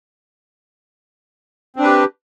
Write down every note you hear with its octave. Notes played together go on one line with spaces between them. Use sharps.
C4 D4 G4 B4